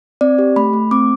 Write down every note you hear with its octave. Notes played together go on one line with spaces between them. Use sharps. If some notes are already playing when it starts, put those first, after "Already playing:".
C4 D5
G4
A3 B5
A3
C4 D6